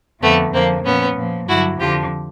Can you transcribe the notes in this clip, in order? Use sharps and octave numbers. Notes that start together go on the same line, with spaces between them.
F2 D3 F3 A3 B3
F2 D3 F3 A#3 C4
A#2 F3 B3 C#4
A#2 F3
G2 D3 F#3 E4 F#4
F2 D3 F3 F4 G4